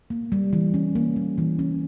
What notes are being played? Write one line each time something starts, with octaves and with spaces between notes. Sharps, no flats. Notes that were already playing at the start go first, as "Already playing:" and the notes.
A#3
G3
E3
C#4
A#3
G3
E3
C#4